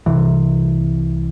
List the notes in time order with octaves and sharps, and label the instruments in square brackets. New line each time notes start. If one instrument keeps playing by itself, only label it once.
[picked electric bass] C2 C3 E3